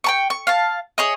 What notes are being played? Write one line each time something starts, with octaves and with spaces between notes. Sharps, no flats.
G5 A5 C#6
C#6
F5 A5
G#4 C#5 D#5